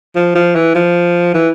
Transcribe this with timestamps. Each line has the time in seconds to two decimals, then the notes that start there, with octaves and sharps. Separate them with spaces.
0.16 F3
0.35 F3
0.55 E3
0.75 F3
1.34 E3